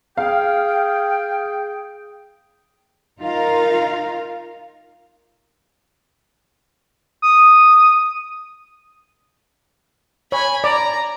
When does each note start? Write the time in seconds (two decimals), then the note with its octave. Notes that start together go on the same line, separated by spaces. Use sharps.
0.17 G#4 F5 G5
3.21 D#4 F4 A#4 F5
7.22 D#6
10.32 C#5 G#5 B5
10.64 D5 A#5